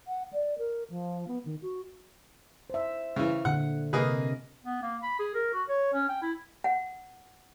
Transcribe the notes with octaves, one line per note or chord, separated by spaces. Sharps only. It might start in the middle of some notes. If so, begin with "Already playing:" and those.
F#5
D5
A#4
F3
B3
D#3
F#4
C5 E5
C#3 E3
A#2 D3 F#5
C3 A#3 G#4 A#4 B4 D#5
B3
A#3
B5
G#4
A#4
F#4
C#5
C#4
G5
E4
F#5